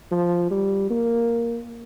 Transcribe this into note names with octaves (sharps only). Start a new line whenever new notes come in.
F3
G3
A#3